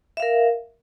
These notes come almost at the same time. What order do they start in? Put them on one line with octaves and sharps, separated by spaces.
E5 F5 A#4